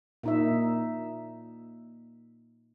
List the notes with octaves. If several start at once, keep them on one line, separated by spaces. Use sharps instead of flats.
A#2 D#4 E5